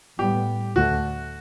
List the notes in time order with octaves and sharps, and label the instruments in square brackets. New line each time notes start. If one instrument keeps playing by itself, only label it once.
[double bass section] A2 G3 B3 [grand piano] G4
[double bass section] D2 D3 A3 [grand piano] F#4